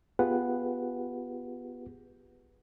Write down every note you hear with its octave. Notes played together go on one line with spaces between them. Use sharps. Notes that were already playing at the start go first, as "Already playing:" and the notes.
B3 F4 G4 G#4 B4 F#5